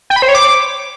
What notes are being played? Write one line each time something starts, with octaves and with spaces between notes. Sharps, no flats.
G5
B5
C5
C#5
D6